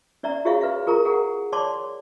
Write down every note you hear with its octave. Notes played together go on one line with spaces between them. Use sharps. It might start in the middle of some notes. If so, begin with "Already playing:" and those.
C#4 D5 E5 A#5
F4 F#4 G#4 C#5 E5 F5
B4 F5
F4 G#4 A#4 A#5
G#4 A#4 F#5
C#5 D5 A5 C6 D6